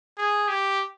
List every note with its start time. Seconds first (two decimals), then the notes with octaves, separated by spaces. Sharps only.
0.17 G#4
0.48 G4